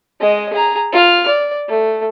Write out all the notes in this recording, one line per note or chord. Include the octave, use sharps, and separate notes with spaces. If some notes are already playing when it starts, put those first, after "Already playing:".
G#3 D#5
G#4 A#5
F4 F6
D5
A3